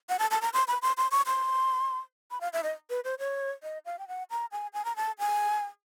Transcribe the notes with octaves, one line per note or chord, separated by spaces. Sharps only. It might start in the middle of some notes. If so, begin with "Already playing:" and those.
F#5
A5
A5
A#5
C6
B5
C6
C6
C#6
C6
B5
F5
E5
D#5
B4
C5
C#5
D#5
F5
G5
F#5
A#5
G#5
G#5
A#5
A5
G#5